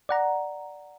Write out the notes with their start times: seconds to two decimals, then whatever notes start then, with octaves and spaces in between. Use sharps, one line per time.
0.09 D5 F#5 A#5